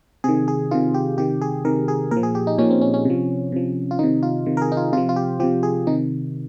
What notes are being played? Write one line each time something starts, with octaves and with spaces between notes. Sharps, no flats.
C3 D#3 G#4
G#4
C3 D#3 F4
G4
C3 D#3 G4
G#4
C3 D#3 A#4
G#4
A#2 A#4
F3
G#4
G4
D#4
A#2 F3 C#4
C4
C#4
C#4
C3 F3
C3 F3
F4
C3 D#3 D#4
F4
C3 D#3
A#4
G#4
D#4
F4
C3 F3 F4
F4
G4
C3 F3 G4
G#4
C3 D#3 D#4